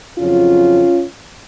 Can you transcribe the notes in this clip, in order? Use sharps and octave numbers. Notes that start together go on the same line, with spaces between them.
F2 C#3 F#3 C#4 F4